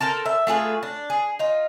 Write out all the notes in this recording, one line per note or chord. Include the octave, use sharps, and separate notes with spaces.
A4 A#4 C5 A5
E5
A3 F4 G#4 B4
D4
G#4
D#4 F4